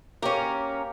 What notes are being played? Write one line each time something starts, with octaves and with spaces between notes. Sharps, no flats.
A#3 C#4 G4 A#4